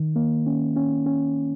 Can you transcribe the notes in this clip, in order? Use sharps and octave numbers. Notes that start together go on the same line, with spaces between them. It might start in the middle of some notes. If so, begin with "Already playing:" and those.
Already playing: D#3
A#3
C#4
C#4
C#4